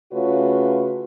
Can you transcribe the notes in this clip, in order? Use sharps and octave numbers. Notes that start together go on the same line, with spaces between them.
C#3 A3 F4 F#4 B4 C#5